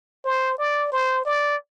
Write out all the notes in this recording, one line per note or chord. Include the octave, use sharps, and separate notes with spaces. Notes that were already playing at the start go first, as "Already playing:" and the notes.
C5
D5
C5
D5